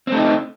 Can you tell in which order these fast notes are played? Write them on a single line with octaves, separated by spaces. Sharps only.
C4 A3 D#4